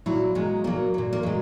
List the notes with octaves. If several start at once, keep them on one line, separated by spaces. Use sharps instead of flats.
A#2 F#3 E4
A#2 F#3 G#3
A#2 F#3 A#3
A#2 F#3
A#3
A#2 F#3 G#3